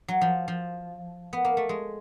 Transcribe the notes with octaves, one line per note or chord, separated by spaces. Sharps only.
F#3
F3
F3
B3
A#3
A3
G#3